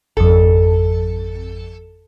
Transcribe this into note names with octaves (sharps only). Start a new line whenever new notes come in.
G#1 F2 A4